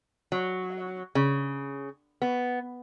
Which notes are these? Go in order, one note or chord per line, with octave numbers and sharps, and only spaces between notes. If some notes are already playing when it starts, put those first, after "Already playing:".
F#3
C#3
B3